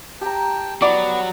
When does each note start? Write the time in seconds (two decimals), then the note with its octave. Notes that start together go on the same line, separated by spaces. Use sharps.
0.21 G4 G5 A5 A#5
0.82 F#3 B3 D5